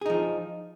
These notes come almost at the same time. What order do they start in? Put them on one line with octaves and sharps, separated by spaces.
G#4 D#4 F3